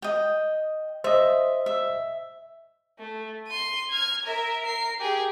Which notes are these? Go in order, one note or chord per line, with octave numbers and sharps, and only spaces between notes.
D#5 G5
C5 D#5 E5
E5
A3
C6 D#7
F6 G#6
A#4 E5
A#4 C7
G4 G#4